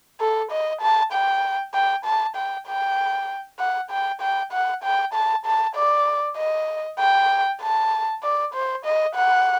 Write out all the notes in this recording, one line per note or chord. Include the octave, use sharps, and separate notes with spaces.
A4
D#5
A5
G5
G5
A5
G5
G5
F#5
G5
G5
F#5
G5
A5
A5
D5
D#5
G5
A5
D5
C5
D#5
F#5